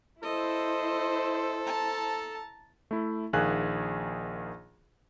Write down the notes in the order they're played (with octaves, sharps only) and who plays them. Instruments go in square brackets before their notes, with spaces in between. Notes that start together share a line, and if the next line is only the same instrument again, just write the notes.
[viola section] E4 C5 [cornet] A4 [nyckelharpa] D#5
[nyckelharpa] A5 A#5
[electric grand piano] A3 E4
A#1 D#3 G#4 F5 G#5 F#6